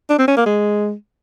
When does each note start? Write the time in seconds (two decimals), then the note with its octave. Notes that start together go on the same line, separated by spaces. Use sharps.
0.09 D4
0.19 C4
0.28 C#4
0.37 A#3
0.46 G#3